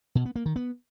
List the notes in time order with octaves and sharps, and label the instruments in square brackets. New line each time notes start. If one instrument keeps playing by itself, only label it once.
[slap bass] B2
B3
A#3
D#3
B3